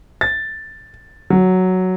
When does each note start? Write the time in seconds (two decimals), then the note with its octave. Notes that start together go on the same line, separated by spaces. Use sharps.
0.21 A6
1.30 F#3